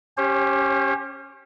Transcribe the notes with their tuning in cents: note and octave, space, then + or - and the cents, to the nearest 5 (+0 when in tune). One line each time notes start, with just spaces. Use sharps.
C#4 +0 G4 +0 C5 +45